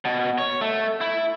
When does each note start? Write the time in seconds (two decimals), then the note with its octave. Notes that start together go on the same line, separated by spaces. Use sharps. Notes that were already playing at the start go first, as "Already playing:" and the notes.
0.05 B2
0.38 C#5
0.61 A3
1.01 E4